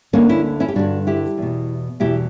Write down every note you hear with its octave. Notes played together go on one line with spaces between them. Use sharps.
D2 D3 A#3 C#4
C#4 E4
C#4 E4
G4
G2 D3 D4 F#4
E4 G4
E2 B2
E2 B2 E4 G4